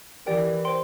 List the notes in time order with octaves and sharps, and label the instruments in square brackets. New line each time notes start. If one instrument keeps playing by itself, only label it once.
[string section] E3 [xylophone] G4 A#4 D5 G5
[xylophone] C5 G5 C6